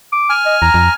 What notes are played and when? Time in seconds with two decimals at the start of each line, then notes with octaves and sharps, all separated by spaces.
0.13 D6
0.29 G#5 F6
0.46 D#5
0.62 E2 A#5
0.74 F2